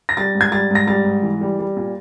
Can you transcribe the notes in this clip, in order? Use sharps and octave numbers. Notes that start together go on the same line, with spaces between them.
A#6
G3 A6
G#2
G#6
G3 A6
G#2
A#6
G3 A6
G#2
E3
G3
G3
A#2